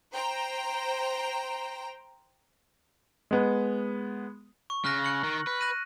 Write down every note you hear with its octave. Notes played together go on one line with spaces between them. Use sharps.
C5 G5 A#5
G#3 B3
C#6
C#3 F6 F#6 A#6
F#6 C#7 F#7
D#3
B4
F#6 A#6 D#7